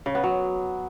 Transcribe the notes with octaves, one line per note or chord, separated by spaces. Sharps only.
C#3
B3
F#3